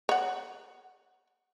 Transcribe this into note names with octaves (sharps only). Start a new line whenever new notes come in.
C#5 F#5